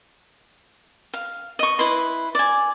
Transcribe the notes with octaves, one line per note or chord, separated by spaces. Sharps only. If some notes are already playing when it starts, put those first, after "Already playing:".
F5
D#5 C#6
E4 B4 C6
D5 G#5